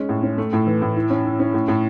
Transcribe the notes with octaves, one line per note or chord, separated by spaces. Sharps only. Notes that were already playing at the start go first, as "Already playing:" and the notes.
Already playing: G#3 C#4
A2
C#4
A3
A2
E3
A2
E4
C#4
E4
C#4
A2
A2